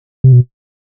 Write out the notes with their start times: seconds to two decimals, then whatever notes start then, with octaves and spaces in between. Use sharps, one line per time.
0.24 C3
0.32 B2